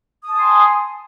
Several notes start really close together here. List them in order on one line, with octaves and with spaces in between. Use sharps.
D#6 A5 G#5 C6